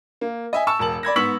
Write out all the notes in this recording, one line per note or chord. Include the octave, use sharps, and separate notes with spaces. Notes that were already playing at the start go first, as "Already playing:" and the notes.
A#3
D#5 E5 G#5
A5 C#6 E6 E7
E1 A#4 A5 F#7
D5 B5 G#6 A#6
G#2 B3 C#6 E6 B6 F#7